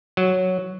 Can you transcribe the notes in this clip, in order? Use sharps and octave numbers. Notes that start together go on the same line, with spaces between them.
F#3